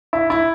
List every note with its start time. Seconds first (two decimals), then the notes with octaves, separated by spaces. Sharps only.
0.13 E4
0.30 E4